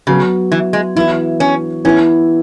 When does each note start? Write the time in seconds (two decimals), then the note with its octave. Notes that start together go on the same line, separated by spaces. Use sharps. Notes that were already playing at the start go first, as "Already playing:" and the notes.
0.07 C#3 F#3 B3 F#4
0.52 E3
0.73 G#3
0.95 E3 B3 E4 F#4
1.40 C#4
1.84 E3 B3 C#4 E4